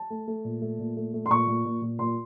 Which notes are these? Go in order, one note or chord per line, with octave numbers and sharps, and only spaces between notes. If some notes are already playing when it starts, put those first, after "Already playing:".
Already playing: A5
A3
A3
A#2
A3
A#2
A3
A3
C6
A#2 C#6
A#2
A#2
A#2
A#2 C6